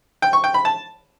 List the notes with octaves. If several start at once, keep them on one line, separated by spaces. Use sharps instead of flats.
G5
C#6
G5
B5
A5